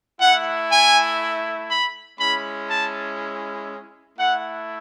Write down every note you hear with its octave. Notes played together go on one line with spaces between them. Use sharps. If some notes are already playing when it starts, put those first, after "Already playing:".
A3 E4 F#5
G#5
B5
G#3 C#4 E4 B5
A5
A3 E4 F#5